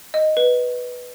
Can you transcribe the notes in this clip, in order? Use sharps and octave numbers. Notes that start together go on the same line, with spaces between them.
D#5
B4